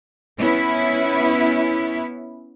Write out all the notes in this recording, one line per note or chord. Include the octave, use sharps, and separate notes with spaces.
B3 C#4 E4